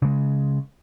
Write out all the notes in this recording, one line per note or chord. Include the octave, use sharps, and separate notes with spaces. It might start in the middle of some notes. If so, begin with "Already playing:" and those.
C#3 G#3